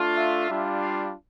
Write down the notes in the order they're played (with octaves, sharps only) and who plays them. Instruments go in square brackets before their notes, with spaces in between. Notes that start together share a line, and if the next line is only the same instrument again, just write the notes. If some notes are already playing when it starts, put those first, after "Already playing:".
Already playing: [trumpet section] A3 D4 F4
E5
G3 D4 F4
F5